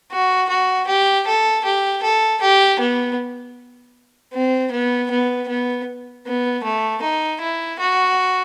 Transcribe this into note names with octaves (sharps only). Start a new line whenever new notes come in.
F#4
F#4
G4
A4
G4
A4
G4
B3
C4
B3
B3
B3
B3
A3
D#4
E4
F#4